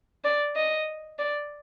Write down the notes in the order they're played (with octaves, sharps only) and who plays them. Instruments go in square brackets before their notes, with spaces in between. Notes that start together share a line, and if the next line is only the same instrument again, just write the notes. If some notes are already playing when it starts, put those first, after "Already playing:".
[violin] D5
D#5
D5